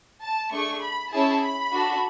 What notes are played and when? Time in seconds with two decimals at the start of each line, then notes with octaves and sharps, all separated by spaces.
0.22 A5
0.52 A3 D4 G#4 C#6
0.82 B5
1.12 C#4 E4 G#4 A5
1.42 B5
1.71 D4 F#4 A4